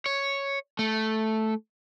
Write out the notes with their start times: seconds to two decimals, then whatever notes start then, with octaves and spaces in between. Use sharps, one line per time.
0.06 C#5
0.79 A3